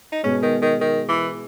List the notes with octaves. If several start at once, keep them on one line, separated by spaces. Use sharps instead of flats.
D#4
B2 G#3 B3 C#4
D#3
D#3
D#3
E3